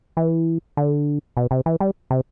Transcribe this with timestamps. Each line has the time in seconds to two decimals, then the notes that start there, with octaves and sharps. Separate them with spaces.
0.17 E3
0.77 D3
1.37 B2
1.51 C3
1.66 E3
1.80 G3
2.11 C3